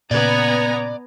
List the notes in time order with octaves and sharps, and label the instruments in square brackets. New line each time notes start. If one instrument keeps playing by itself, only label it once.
[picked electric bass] A#2 C#3 [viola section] B3 G#5 A#5 [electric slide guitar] D5